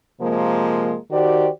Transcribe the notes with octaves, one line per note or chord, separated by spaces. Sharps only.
C3 F3 G#3 A#3
D#3 F#4 G4 C5 D5